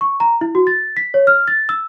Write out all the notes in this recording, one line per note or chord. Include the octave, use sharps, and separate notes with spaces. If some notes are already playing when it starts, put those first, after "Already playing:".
C#6
A#5
E4
F#4
A6
B6
C#5
F6
A6
E6